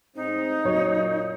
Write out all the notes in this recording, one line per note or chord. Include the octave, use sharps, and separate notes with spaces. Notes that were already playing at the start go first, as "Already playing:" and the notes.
A2 G#3 C4 D#4
F#2 A#2 C#5 D#5